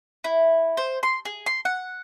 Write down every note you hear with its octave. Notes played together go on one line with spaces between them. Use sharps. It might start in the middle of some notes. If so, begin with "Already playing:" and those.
E4
C5
C6
G#4
C6
F#5